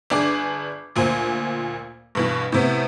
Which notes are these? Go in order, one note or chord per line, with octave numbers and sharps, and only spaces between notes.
G1 D4 G#4 D6
D2 A#2 C5 G#5
G2 B2 E3
A2 C3 B3